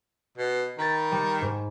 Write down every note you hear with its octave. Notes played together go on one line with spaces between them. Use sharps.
B2
D#3 B5 A6
G3
G#2